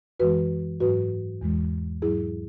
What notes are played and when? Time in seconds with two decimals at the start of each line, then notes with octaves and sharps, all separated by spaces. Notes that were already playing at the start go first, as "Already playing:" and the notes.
0.20 F#2 E3 G#3 F#4 B4
0.80 G#2 F#3 F#4 B4
1.41 E2 E3 G#3
2.02 G#2 F#3 E4 G#4